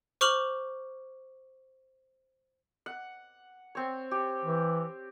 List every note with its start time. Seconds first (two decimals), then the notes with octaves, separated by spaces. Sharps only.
0.21 C5 C#6 D6 F6 F7 F#7
2.86 F#5
3.75 C4 C#5
4.11 G4
4.45 E3